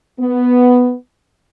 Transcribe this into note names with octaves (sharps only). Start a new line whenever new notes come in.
B3